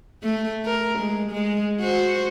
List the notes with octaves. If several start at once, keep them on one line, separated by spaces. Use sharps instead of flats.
A3
A#4
G#3
G#3
F#4 C5